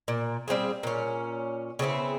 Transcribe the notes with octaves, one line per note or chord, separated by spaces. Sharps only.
A#2
G3 C4 F4 G#4
A#2 C#4
C#3 B3 C4 E4